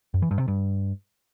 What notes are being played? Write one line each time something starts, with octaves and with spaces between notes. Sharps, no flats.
F#2
E3
G2
C3
G2